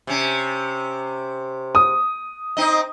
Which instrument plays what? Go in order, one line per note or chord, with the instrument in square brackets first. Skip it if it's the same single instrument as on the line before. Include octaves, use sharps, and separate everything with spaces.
[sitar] C3 C#4
[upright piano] D#6
[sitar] C4 D#4 D#5